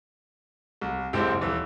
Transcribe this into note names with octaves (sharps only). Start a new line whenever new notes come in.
C2
F#1 G#2 C4 E4 G4
D#1 E3 E6